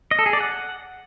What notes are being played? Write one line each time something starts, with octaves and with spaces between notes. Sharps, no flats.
D#5
A4
G#4
D5
F#5